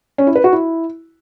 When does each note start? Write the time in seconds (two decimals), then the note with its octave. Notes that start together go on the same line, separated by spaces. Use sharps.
0.18 C#4
0.27 E4
0.35 B4
0.44 F#4
0.53 E4